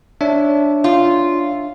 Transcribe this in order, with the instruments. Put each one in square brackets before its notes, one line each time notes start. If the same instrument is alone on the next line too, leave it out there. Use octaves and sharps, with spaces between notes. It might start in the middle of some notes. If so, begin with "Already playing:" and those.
[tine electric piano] D4 C#5 E5
[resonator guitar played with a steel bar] F4